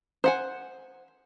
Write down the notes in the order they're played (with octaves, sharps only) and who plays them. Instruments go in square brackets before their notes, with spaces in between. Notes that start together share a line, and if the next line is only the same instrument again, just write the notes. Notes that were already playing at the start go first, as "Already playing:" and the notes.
[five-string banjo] C5 F#5 G#5